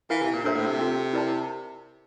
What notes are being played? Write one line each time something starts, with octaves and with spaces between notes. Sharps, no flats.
E3 E4 A#4 F5
C3
A#2
A#2 D4 A4 C5 E5
A2
C3
C4 F4 A4
E4 A#4 D5 A5